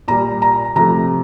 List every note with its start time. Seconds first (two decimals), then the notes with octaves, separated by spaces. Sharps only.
0.08 A#2 G3 A#5
0.42 A#5
0.76 C3 F3 A3 A#5